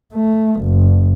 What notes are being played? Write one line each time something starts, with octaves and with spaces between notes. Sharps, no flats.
A3
F#1